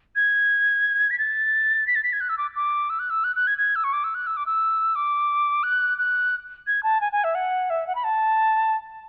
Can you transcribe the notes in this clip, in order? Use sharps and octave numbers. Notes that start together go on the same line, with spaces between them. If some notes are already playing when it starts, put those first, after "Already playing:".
G#6
B6
A6
B6
A6
B6
G#6
F#6
E6
D6
D6
E6
F#6
E6
F#6
F#6
G#6
G#6
E6
C#6
D6
E6
F#6
E6
D6
E6
D6
F#6
F#6
G#6
A5
G#5
G#5
E5
F#5
E5
F#5
B5
A5